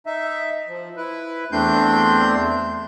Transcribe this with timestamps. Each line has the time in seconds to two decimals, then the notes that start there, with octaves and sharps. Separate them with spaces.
0.06 D#4 E5
0.68 F3
0.97 E4 B4
1.52 E2 A3 C4 D4 C6 G6